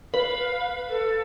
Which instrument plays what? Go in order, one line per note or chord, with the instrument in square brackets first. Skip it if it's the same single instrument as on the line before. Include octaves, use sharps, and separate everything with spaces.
[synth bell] B4 [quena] F5
[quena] A4